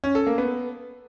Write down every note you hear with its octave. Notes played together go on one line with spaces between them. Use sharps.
C#4
A4
A#3
B3